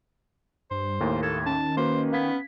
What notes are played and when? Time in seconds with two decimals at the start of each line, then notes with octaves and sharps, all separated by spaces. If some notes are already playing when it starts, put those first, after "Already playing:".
0.71 G2 C5
1.00 D#2 A2 A#3
1.23 A4 G#6
1.46 D#3 C#4 A5
1.77 A#3 F#4 B4 C5
2.13 B3 F5 G#6 B6